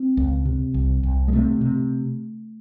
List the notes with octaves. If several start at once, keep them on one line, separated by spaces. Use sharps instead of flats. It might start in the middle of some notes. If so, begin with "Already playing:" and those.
Already playing: C4
C#2
C3
C2
C2
G#3
C3 A3
C3